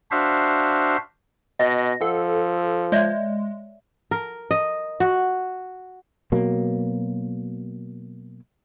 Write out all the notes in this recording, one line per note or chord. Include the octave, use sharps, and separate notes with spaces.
D4 F#4 C5 E5 F5
B2 D#5 A#6
F3 A4 F#5
G#3 C#5 D5 E5
A#4
D#5
F#4
B2 F#3 A#3